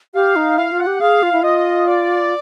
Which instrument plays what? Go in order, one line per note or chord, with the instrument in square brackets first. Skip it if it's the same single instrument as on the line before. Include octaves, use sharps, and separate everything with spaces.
[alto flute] G4 [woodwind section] F5
[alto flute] D#4
[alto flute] E4 [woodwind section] F5
[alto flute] F4
[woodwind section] F#5
[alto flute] G4
[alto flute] G#4 [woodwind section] F5
[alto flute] F4
E4
[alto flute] F4 [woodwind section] D#5
[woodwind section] D5